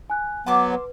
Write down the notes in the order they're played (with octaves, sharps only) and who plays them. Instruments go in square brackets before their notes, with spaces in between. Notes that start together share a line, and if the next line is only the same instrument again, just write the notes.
[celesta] G#5 F#6
[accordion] F#3 B3 [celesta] F#5 [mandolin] A5 C6 D6
[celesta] B4